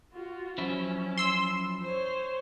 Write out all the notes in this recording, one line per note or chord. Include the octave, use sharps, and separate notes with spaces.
F4 F#4
F#2 F3 C#4 E4
C6 E6
C5 C#5